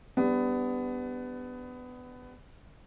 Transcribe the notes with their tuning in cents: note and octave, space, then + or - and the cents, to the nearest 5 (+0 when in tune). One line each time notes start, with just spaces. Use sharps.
G3 +15 B3 +20 D4 +0